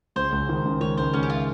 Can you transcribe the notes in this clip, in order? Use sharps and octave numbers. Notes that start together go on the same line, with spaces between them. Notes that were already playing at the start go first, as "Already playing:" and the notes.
C#2 C5
C#2
D#3
C#2
D#3 C#5
C#2 C5
C#2 C#4
G4
F4